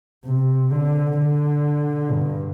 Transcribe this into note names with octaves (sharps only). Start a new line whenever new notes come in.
C3
D3
D3
G2